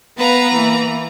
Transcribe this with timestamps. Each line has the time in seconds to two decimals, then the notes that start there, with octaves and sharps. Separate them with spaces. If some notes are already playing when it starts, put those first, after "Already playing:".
0.18 B3 B4 F5 A#5
0.53 E3 A#3